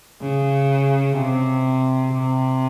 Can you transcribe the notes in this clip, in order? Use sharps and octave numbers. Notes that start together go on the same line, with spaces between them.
C#3
C3
C3